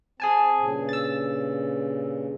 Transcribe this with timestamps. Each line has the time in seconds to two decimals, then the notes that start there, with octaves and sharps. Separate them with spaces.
0.20 C4 G#4 G#5 A5
0.58 G2 A#2 C#3
0.89 E6 A6